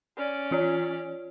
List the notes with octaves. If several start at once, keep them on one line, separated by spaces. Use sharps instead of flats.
C#4 D5
E3 F4 C#5